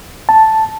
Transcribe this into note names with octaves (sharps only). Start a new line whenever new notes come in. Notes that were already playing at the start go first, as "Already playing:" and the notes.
A5